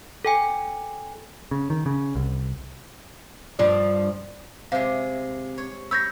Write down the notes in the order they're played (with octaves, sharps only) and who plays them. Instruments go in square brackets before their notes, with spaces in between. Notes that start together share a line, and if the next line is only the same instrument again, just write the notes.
[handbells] A4 G5 G#5
[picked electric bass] C#3
D#3
C#3
C2
[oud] G2 F3 D4
[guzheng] C3 G#3 [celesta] F5
[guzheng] C#5
[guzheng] C#5 B5 [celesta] E6 G6 A#6